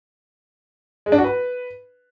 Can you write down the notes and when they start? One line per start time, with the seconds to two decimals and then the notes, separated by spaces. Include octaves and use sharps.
1.06 G#3
1.12 D4
1.18 F#4
1.24 B4